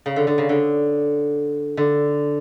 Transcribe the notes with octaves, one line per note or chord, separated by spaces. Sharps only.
C#3
D3
D3
C#3
D3
D3